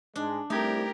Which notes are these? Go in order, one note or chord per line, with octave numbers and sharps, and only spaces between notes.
G#2 G#3 D4
C2 A3 D#4 G4 A#4 G#6